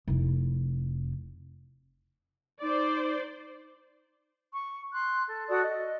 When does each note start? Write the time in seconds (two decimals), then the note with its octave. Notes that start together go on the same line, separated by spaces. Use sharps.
0.07 F1 E4
2.62 D#4 C5 D5
4.54 C#6
4.92 C6 F#6
5.27 A4
5.47 F#4 A4 D5 D#6
5.61 D#5